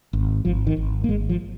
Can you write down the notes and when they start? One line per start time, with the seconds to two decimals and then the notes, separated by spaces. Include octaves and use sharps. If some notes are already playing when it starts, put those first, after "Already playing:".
0.13 G#1
0.45 G#1 F3
0.67 D#3
0.77 G#1
1.04 A#3
1.09 G#1 G#3
1.29 F3